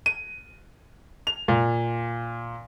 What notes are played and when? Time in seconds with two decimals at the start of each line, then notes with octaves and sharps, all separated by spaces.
0.06 D#7
1.27 F7
1.48 A#2